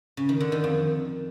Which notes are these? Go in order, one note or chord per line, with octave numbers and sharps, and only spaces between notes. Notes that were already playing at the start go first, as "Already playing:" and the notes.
C#3
D#3
D3
D#3
F2